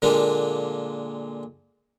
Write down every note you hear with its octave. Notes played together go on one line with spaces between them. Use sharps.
A#2 D3 G#3 A#3 D4